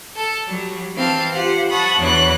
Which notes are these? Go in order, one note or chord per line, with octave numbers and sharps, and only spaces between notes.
A4 A5
F#3 G3
E3 C4 F5 A5
F4 G4 C5 F#5
F#5 A5 B5 C#6 D#6
E2 E3 F#3 D4 F#6